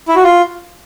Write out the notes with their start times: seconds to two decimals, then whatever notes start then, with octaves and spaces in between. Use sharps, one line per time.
0.08 E4
0.16 F#4
0.23 F4